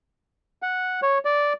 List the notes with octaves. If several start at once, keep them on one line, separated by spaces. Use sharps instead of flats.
F#5
C#5
D5